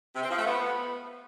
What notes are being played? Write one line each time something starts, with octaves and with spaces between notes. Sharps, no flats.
C3
C4
F3
A3
B3